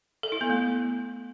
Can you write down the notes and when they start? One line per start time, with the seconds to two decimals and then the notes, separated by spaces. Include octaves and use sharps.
0.23 A4
0.32 E4
0.41 B3
0.50 A3